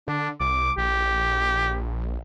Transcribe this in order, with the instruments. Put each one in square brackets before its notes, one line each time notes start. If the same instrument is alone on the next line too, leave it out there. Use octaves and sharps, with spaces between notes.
[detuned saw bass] D3 [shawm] D4
[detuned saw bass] C2 [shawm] D6
[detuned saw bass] A#1 [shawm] G4